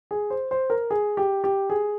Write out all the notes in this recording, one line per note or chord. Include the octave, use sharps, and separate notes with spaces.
G#4
C5
C5
A#4
G#4
G4
G4
G#4